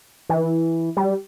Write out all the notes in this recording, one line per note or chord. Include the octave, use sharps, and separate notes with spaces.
E3
G3